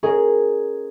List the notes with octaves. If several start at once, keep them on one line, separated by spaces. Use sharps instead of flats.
C#4 G#4 A#4 D#5